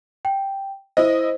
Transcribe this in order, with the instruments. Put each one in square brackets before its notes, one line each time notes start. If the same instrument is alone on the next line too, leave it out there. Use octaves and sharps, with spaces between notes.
[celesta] G5
[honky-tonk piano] E4 D#5 [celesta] C5